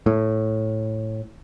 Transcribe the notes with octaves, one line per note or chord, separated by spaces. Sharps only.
A2